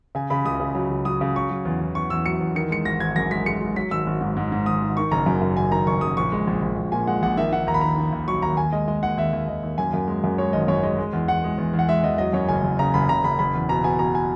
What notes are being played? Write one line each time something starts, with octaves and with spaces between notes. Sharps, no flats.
C#3 G#5
C#3 B5
C#2 D#6
C#3
F#3
C#2
F#3 D#6
C#3
F#3 C#6
F#3
E2
E2
E2 C#6
E2 E6
F#3 C#7
E2
D#3 C#7
G#3 C#7
G#1 A#6
G#1 G#6
F#2 A#6
G#3 B6
G#3 C#7
G#3
F#3 B6
G#1 E6
G#1
G#2
G#2
G#2
G#1 D#6
G#1
D#3 C#6
F#1 A#5
F#2
F#2
F#1 G#5
D#3 A#5
F#1 C#6
F#1 D#6
A#1 C#6
G#3
A#1
A#1
A#1
A#2 G#5
G#3 F#5
A#1 F#5
D#3 E5
D#3 F#5
D#2 A#5
B5
D#3 A#5
D#3
D#2
F#3 C#6
D#2 A#5
D#2 G#5
G#3 D#5
G#3 D#5
D#2 F#5
D#2 E5
D#2
D#2 D#5
D#2
F#2 G#5
F#2
G#3
F#2
G#3 C#5
G#1 D#5
F#2 C#5
G#3 D#5
G#3
E2
E2 F#5
G#3
E2
E2
F#5
G#3 E5
E2 D#5
F#3 D#5
F#2 C#5
F#1 G#5
F#1
C#3 A#5
F#1 B5
F#1 A#5
F#1 B5
F#1 B5
E2
B2 A#5
B2 G#5
B2 A#5
G#5